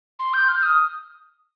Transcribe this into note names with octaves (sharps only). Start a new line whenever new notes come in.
C6
G6
F6
D#6